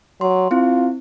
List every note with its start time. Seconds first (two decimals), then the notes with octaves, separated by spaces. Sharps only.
0.21 F#3 C6
0.51 C4 E4 F4